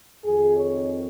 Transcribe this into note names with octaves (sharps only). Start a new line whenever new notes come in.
F2 D#3 G#4
C#5